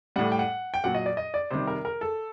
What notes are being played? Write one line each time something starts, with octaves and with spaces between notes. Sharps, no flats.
A2 G3 F#5
G5
F#5
G5
A#2 F#3 F#5
D#5
D5
D#5
D5
C3 D#3 G3 C5
A#4
A#4
A4